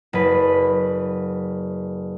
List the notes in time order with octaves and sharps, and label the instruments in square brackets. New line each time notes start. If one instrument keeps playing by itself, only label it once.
[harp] F#1 B4